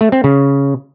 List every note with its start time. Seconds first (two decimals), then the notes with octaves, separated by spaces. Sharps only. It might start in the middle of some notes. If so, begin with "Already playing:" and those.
0.01 A3
0.12 C4
0.24 C#3